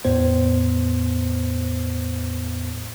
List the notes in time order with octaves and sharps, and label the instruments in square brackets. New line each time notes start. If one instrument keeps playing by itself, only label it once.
[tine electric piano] E2 A2 B3 C5